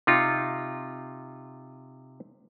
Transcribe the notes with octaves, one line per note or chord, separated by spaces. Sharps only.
C3 D#4 F4